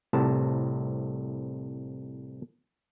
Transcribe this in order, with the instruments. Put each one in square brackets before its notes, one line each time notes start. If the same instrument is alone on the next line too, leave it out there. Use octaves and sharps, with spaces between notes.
[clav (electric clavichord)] C2 A2 C3 A5